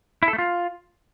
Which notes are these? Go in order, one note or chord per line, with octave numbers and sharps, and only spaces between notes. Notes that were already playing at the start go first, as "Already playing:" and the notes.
E4
A4
A3
F4